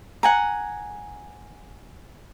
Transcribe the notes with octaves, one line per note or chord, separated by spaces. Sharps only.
F#5 G#5 A#5